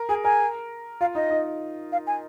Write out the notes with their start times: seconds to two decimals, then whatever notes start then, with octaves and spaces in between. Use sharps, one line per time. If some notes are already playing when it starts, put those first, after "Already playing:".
Already playing: A#4
0.09 G#4 G#5
0.24 A#4 G#5
1.01 F4 F5
1.15 D#4 D#5
1.30 D#4
1.92 F5
2.07 G#5